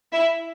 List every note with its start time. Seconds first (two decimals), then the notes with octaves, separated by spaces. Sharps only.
0.12 E4 E5